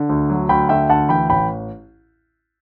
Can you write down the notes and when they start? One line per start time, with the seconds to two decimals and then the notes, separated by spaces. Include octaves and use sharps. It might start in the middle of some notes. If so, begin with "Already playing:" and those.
Already playing: D3
0.09 D2
0.29 F#3
0.49 D2 G5 B5
0.69 D3 E5 G5
0.89 D2 F#5 A5
1.09 E3 G5 B5
1.30 A1 G5 B5